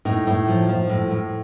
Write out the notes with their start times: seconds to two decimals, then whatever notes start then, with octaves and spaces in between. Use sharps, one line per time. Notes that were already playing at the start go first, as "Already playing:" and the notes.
0.05 A2 D#4
0.27 A2
0.48 F3
0.69 F3
0.90 A2
1.11 A2